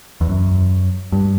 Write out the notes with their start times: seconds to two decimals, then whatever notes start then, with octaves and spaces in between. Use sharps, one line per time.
0.21 E2
0.29 F#2
1.12 G2